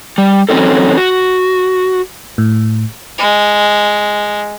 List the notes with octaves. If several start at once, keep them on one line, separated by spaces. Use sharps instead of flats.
G3
E3 F#3 C4 C#4 D#4 A4
F#4
A2
G#3